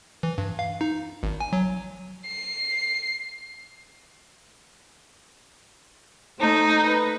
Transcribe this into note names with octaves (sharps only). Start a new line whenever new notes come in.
E3
G2
F5
D#4
G#1
G#5
F#3
C7
A3 D#4 C5
B4